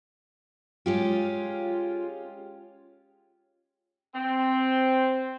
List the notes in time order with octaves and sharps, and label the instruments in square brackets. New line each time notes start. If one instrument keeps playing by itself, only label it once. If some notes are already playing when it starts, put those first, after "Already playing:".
[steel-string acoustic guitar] G#3 C#4 G4 [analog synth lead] F4
[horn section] C4